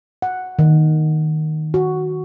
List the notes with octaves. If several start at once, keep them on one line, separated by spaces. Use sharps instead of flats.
F#5
D#3
F#4